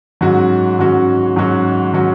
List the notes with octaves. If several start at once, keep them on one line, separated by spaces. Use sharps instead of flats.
G#2 F#3 C#4 F#4
G#2 F#3 C#4 F#4
G#2 F#3 C#4 F#4
F#3 C#4 F#4